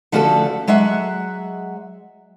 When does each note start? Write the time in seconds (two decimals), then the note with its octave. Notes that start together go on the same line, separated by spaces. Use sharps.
0.12 D3 F3 A3 C#4 F#4 A4
0.67 F#3 G#3 E5 F#5